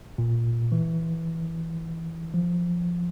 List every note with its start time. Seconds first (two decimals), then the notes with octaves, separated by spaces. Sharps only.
0.18 A#2
0.72 E3
2.34 F3